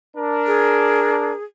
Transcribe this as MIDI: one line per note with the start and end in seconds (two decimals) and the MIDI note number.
0.16 1.32 62
0.16 1.32 70
0.47 1.44 68